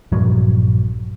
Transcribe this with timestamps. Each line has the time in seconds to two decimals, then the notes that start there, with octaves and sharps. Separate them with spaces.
0.12 A#1 G2 F#3